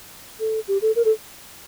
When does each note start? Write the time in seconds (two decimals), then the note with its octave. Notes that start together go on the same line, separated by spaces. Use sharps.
0.40 A4
0.68 G4
0.82 A4
0.96 A#4
1.05 A4